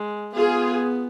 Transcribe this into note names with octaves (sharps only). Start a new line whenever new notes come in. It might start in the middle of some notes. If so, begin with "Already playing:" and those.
Already playing: G#3
B3 F4 G#4